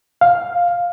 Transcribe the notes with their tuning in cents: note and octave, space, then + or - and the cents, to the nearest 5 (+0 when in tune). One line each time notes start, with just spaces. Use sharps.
F5 +5